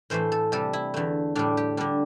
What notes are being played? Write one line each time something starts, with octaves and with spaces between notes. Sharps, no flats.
A2 E3 A3 C5
A4
C3 G3 A4
E4
E2 D3 A3
A2 G3 D4
G4
D3 G3 D4